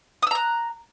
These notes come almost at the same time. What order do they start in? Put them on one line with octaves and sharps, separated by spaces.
D#6 E6 A#5 F#6